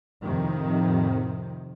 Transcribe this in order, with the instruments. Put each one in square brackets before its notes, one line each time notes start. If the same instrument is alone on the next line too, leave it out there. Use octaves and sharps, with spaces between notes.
[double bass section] F2 A2 C3 D#3